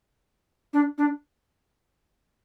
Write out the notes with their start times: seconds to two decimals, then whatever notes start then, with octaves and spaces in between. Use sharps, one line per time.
0.73 D4
0.98 D4